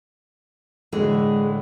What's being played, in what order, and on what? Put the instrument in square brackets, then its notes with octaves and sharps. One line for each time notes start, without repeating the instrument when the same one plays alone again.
[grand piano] A2 D3 E3 [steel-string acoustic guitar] G#3